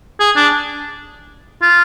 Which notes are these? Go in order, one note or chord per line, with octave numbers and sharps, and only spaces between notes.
G#4
D4
F4